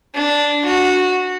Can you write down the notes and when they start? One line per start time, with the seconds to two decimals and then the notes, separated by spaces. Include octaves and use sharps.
0.15 D4
0.65 F#4